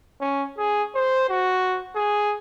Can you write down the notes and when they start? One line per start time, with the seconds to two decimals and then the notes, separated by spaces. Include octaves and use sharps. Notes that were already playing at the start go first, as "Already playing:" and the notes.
0.21 C#4
0.58 G#4
0.95 C5
1.29 F#4
1.95 G#4